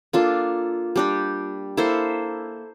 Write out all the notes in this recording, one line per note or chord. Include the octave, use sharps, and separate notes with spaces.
A#3 D4 F4 A4
G3 D4 G4
A#3 E4 A4 C5